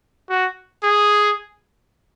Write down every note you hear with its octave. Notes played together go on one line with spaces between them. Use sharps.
F#4
G#4